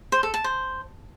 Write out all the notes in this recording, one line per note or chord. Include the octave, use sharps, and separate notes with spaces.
C5
A4
A5
C5